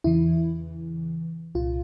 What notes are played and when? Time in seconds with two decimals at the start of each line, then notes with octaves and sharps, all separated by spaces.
0.04 E2 C#3 E3 E4
1.55 C2 A#2 F4